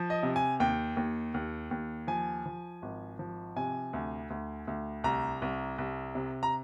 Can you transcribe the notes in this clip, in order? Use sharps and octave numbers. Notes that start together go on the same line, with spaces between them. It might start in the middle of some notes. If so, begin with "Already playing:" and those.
Already playing: F3
D#5
C3
G#5
D#2 G5
D#2
D#2
D#2
F3 G#5
F3
G#1
F3
C3 G#5
D2
D2
D2
C2 A#5
C2
C2
C3
A#5